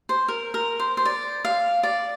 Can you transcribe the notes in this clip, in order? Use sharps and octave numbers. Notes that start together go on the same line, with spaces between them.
C5
A#4
A#4
C5
C5
D5
F5
D5